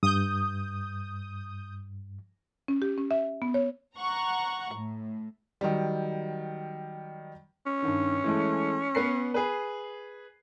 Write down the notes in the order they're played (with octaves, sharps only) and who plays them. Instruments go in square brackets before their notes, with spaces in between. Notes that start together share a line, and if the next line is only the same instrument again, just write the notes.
[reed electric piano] G2 [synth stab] D#6 G6
[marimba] C#4
G4
C#4
E5
B3
C#5
[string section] F#5 A#5 C#6
A2
[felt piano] D#3 F#3 G3
[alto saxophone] C#4
[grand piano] G2 D#3
E3 G#3 A3
B3 B4 C7
G#4 B4